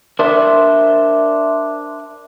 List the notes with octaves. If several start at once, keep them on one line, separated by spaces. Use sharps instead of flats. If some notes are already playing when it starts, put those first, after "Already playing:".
D4 A#4 C5 D5 E5